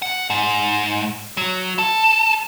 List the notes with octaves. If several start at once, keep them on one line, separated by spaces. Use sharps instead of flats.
F#5
G#2
F#3
A4